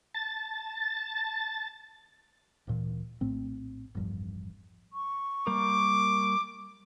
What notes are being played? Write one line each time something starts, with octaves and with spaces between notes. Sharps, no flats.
A5 A6
D1 A#2 E3
A#1 A2 A3 C4
E1 A1 G2 F3
C#6
G3 A#3 A#4 D6